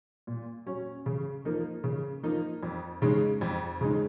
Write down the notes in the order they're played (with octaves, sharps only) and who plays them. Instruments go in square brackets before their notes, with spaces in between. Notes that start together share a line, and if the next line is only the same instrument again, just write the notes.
[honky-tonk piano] A#2
F#3 C#4
C#3
F3 A#3 D#4
C#3
F3 A#3 D#4
F2
C#3 G#3 D#4
F2
C#3 G#3 D#4